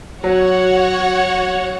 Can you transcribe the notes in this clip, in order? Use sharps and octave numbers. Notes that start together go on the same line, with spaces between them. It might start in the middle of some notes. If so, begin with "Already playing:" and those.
F#3 F#4 C#5 F#5